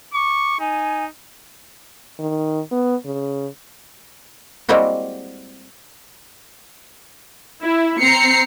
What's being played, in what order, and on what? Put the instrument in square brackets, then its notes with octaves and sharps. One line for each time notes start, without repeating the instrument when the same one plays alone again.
[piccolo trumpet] C#6 [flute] D6
[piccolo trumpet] D#4 [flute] G#5
[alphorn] D#3
B3
C#3
[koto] G3 G#3 A#3 C4 E4 F#4
[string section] E4
C4 A#5 C7 C#7